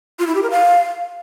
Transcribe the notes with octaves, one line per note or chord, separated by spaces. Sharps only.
F4
E4
G4
A#4
F5